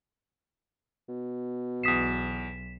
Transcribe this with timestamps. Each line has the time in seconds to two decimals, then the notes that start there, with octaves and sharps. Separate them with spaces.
1.09 B2
1.83 B1 E2 D#6 B6 C7 E7